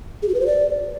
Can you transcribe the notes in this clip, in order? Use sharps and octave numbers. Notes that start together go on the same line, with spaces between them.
G#4
F#4
B4
C5
D5